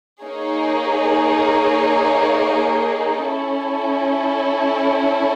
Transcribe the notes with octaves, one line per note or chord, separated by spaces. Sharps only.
A#3 D#4 G#4 C#5
C#4 E4 A4